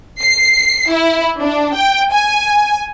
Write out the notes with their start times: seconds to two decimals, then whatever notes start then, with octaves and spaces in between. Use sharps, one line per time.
0.20 C7
0.91 E4
1.41 D4
1.75 G5
2.12 G#5